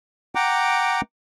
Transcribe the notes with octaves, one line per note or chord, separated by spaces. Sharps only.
F#5 G5 A#5 D6